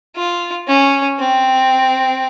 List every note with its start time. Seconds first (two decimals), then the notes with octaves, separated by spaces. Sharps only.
0.16 F4
0.68 C#4
1.19 C4